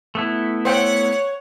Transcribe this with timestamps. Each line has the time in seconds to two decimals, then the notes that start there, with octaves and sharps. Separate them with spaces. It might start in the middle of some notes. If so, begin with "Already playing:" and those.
0.15 A3 B3 E4
0.65 C5 C#5 F#5 G5